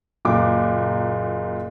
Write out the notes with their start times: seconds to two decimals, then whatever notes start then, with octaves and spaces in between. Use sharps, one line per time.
0.25 F#1 A#2 D6